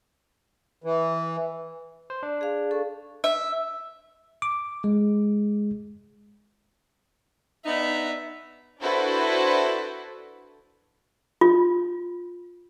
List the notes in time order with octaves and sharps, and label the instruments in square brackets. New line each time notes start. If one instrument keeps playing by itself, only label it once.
[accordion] E3
[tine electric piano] C5
D4
[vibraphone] G#4 F5
A4 C#6
[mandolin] E5
[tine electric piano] D6
G#3
[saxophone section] B3 D4 D#4 [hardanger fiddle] E5
[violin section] D4 E4 F#4 A4 B4 C5
[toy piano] F4